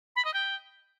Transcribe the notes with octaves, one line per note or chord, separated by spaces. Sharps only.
B5
D#5
G5